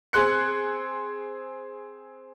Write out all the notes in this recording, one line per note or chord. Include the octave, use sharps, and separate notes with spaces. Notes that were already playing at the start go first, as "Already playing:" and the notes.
C4 G#4 C6 F#6 C#7